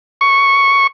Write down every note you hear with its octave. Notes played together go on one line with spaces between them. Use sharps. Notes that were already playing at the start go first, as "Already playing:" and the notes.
C#6